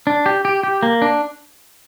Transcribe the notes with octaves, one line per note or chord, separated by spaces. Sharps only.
D4
G4
G4
G4
A#3
D4